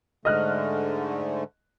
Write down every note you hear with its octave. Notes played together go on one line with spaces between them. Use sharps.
G#2 D3 A3 D#5 F6 F#6